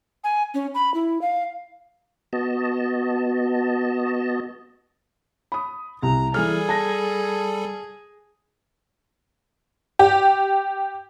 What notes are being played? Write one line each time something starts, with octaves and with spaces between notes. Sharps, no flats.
G#5
C#4
B5
E4
F5
B3 F#4 D#5 A5
B5 D#6
C2 A#5
E3 G3 G#4 A4 F6
A5 A#6
G4